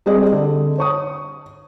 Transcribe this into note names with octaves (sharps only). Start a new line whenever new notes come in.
G3 C4 G#4 D5 D#5
D3
C#5 C#6 D#6